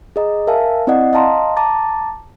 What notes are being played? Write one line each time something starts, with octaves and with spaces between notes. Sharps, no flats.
G#4 D#5 A#5
A#4 E5 F5 G#5 A5
C4 E4 D5 D#5 F#5
D#5 F5 A5 A#5 C6
A5 A#5 D6 A6